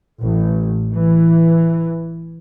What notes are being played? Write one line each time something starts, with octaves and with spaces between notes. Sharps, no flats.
A1
E3